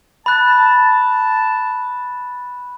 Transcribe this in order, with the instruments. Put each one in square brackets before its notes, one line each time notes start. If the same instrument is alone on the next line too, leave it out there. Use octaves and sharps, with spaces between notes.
[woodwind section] A5 [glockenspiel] B5 F#6